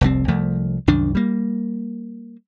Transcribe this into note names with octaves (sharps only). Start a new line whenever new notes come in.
F1 C2 G3 C4
C2 F3 A3
C2 F#2 D#3 D4
G3 A#3